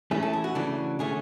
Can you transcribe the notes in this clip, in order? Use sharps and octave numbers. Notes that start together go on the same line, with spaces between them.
E3 A3 C#4 E4 G#4
A4
G#4
F#4
C#3 E3 A3 D4
D3 A3 C#4 G#4